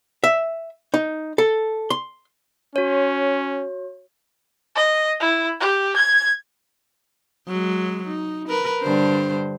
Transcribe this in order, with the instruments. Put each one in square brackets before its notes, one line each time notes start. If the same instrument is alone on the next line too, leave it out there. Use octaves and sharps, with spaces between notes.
[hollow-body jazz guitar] E5
D#4
A4
C6
[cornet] C#4 [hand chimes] F#4 C#5
[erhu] D#5
E4
G4
G#6
[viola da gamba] F#3 G#3
D#4
A#4 B4
G2 D3 C5